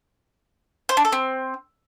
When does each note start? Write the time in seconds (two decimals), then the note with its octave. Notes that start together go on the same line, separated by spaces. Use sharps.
0.89 C5
0.97 D4
1.05 A4
1.12 C4